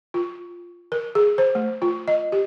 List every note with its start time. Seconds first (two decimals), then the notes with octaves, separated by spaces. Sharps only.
0.14 F4
0.92 A#4
1.15 G#4
1.38 C5
1.55 A3
1.82 F4
2.08 D#5
2.32 G4